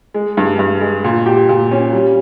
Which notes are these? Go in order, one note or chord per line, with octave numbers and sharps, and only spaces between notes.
G#3
G2
G2
G#3
A#2
G4
A#2
C#4
G3